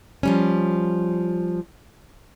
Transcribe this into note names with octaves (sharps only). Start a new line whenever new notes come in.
F3 G3 C#4